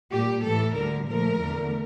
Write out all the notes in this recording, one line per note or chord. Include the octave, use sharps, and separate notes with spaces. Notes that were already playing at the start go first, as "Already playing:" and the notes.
A#2 G3 G4
A2 E3 A3 A4
D2 D3 G3 A#4
A#2 F3 A3 A#4
E2 D3 A3